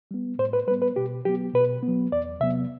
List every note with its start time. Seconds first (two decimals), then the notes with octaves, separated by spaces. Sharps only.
0.11 G3 B3
0.39 A2 C5
0.53 B4
0.68 G3 B4
0.71 B3
0.82 B4
0.96 B2 G4
1.25 F#3 B3 G4
1.54 B2 B4
1.83 B3
1.88 F#3
2.12 E2 D5
2.41 C3 F#3 B3 E5